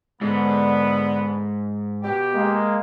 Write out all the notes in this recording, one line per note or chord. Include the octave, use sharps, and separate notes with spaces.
G#2 D3 B3
B2 G4
G#3 A#3